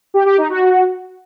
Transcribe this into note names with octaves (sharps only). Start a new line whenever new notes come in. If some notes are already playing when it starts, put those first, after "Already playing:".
G4
G4
D#4
F#4